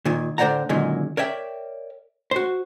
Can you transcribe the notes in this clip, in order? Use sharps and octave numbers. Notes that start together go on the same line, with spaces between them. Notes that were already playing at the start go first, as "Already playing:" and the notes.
A#2 D#3
A2 D3 C5 D5 F#5 A#5
F#2 A#2 D3 D#3 G#3
A#4 C#5 D5 E5 G5
F#4 C5